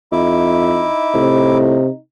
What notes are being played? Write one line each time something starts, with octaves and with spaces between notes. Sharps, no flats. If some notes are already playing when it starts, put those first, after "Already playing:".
F2 D#4 E4 E5 D6
A2 C3